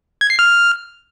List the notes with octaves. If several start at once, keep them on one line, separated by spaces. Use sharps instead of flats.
G#6
C7
F6